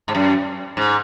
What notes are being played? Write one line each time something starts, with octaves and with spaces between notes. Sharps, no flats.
G#2
F#2
G#2